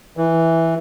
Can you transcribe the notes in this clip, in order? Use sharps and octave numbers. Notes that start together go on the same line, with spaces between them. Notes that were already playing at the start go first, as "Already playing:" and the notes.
E3